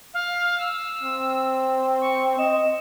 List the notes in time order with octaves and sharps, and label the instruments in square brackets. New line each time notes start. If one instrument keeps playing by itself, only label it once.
[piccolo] F5
E6
[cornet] C4
[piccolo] C#6
[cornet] D#5 [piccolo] E7